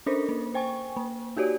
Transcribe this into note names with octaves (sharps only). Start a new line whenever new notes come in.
C#4 D4 A4 A#4 C5
A#3
C5 G5 G#5 C#6
A#3
D#4 F#4 G4 C#5 D5